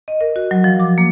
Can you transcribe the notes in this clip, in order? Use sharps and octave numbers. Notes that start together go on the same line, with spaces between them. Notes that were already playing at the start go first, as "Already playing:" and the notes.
D#5
A#4
F#4
F#3
F3
D6
A#3